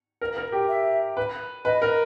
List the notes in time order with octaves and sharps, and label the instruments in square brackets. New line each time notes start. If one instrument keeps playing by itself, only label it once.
[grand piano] A#4
A#4
G4
[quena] E5
[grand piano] B4
[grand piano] B4 [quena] D#5
[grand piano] A#4